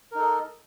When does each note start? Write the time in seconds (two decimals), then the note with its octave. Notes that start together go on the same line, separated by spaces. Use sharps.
0.11 A#4
0.15 D#4
0.19 A4
0.22 D#5